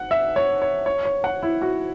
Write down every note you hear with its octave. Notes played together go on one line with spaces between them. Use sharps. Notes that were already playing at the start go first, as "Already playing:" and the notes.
Already playing: F#5
E5
C#5
C#5
C#5
C#5
F#5
E4
F#4